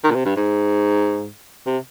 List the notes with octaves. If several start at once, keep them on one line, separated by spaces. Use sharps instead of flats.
D#3
A#2
C3
G2
G#2
C3